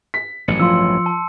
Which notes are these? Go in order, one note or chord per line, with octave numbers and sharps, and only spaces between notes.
B6
A1 G2 F#3 C#7
F3 C6 E6
A5